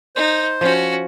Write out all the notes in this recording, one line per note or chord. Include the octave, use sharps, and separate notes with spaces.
D#4 C5
F3 C#4 F#4